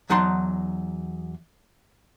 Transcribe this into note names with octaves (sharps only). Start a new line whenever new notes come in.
E2 F#3 D#4 F#5 A5 C6